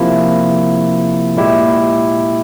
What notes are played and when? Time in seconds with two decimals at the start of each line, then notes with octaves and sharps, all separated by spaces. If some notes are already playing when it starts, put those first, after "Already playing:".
Already playing: C3 F3 A#3 E4
1.37 A#2 G#3 E4 G4